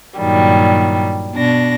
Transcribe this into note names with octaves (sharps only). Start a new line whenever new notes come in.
G2 A#2 D#3 F#3 G3
B2 D4 A#6